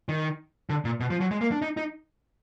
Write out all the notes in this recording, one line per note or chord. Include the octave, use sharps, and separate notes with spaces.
D#3
D3
A#2
B2
F3
F#3
G#3
A#3
D4
D#4
D#4